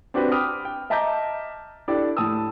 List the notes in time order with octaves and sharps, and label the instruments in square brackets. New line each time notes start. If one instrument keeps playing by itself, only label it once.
[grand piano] C4 D4 F#4 G4 B4
G5 B5 D6 D#6 F6
G5
D#5 E5 A5 A#5 D6 G6
D4 E4 G4 A4 D5
A2 A5 D#6 E6